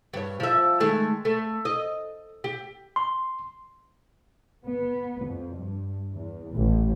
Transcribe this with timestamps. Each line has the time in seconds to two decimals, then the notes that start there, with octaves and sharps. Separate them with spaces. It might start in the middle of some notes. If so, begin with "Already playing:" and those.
0.13 G2 C#5
0.40 F3 E5
0.80 D#3 G#3 A3
1.25 A3
1.65 D#5
2.44 G4
2.96 C6
4.65 B3
5.23 F2
5.56 G2
6.11 E2
6.55 A1